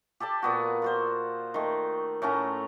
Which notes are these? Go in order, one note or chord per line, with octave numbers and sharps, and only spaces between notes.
G4 A4 D5 A5
A#2 B3 F#4
F4 F#4 C5
D#3 A3
A2 A3 C#4 A#5